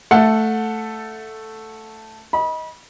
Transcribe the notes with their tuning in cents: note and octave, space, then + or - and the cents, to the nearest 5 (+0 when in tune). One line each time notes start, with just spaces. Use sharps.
A3 +0 A4 +0 F#5 -20
D#5 +15 B5 -30